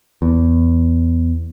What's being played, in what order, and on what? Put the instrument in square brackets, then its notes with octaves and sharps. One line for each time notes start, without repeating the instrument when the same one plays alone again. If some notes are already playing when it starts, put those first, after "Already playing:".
[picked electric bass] E2